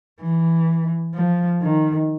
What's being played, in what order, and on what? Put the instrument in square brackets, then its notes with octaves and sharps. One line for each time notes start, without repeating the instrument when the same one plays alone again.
[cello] E3
F3
D#3